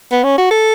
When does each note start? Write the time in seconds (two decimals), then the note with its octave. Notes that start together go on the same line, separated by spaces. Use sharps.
0.12 B3
0.24 C#4
0.38 F#4
0.51 A4